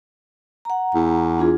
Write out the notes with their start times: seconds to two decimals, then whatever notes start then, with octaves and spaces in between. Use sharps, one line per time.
0.65 F#5 A#5
0.95 E2
1.39 D4 F4 G#4